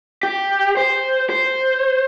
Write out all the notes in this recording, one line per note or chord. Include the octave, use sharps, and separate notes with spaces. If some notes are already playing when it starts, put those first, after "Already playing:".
G4
C5
C5